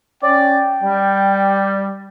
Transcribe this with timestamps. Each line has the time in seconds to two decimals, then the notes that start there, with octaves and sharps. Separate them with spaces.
0.23 C#4 D5 G5
0.83 G3